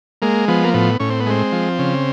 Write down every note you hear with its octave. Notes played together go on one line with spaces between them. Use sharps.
G#3 A#3
F3 B3
A#3
A2 B3
A2 C#4
C4
B3
G#3 C4
F3
C#3